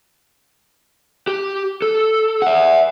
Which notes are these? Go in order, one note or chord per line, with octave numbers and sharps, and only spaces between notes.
G4
A4
E5 F#5